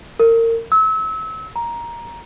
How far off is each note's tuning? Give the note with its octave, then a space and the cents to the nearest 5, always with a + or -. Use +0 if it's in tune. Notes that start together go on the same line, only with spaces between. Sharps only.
A#4 -30
E6 -30
A#5 +10